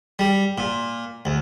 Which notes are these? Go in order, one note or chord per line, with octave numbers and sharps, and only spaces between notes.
G3
A#2
D2